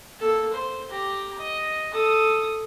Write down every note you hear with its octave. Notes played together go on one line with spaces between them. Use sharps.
A#3 A4
C5
G4 A#5
D#5
A4 D#6